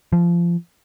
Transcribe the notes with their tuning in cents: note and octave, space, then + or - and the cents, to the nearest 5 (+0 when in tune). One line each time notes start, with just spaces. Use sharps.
F3 -20